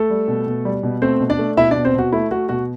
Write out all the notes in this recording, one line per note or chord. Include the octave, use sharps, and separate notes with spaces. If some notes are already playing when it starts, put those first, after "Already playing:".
Already playing: A3 A4
G3
B2
B2
G3
B2
A3 C4 C5
B2
D4 D5
A3
B2 E4 E5
D4 D5
B2
C4 C5
B2 F#4
A3 E4
A3 F#4
B2 F#4